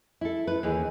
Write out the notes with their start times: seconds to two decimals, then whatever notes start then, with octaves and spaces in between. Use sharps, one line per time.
0.21 E4 A4
0.47 B4
0.63 D#2 E3 G#4